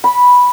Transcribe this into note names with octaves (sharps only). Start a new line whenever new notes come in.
B5